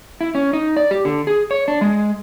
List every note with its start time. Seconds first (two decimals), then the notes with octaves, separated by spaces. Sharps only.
0.21 E4
0.35 C#4
0.53 D#4
0.77 D5
0.91 G4
1.05 D3
1.27 G#4
1.51 C#5
1.68 D4
1.81 G#3